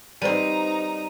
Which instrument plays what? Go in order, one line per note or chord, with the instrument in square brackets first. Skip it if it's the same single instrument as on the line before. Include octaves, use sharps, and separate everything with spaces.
[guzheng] G3 C4 [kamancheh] D#4 A#5 [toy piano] B4 C5 D5 [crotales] D#7